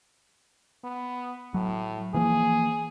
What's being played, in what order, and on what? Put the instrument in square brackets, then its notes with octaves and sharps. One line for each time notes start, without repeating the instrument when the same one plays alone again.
[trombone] B3
[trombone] A2 [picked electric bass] F#3
[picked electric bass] E3 F3 A#3 [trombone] G#4